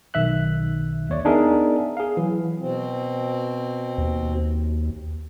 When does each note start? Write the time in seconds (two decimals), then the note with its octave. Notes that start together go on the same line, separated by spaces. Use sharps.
0.14 B1 D#3 E5 F#6
1.09 D#2 C#5 D5
1.25 B3 D4 D#4 G#4 A#4 E5
1.97 G#4 F5
2.17 E3 F#3
2.58 B2 C4
3.98 D#2